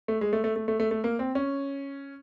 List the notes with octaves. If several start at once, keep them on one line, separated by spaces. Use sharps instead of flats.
A3
G#3
A3
A3
A3
A3
A3
A3
A#3
C4
C#4